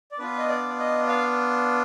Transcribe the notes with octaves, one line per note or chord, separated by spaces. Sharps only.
D5
B3 D4 F4 B4
D#5
D5
D#5
F5